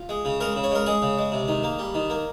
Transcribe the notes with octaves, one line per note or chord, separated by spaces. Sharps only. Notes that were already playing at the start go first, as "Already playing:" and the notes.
Already playing: F4
G#3
C#3
G#3 A#4
C#3
C#5
G#3 A#4
G#3 G#4
C#3
G#3
C3
D#3
A#3
G3
D#3
A#3